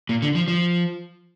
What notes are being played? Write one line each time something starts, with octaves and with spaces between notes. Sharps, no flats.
A#2
D3
F3
F3